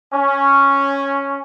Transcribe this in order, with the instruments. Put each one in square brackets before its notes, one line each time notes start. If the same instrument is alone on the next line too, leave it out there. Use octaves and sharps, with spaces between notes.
[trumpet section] C#4